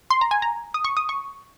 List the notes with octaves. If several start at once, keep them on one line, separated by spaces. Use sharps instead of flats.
C6
A#5
G#5
A#5
D#6
C#6
D#6
C#6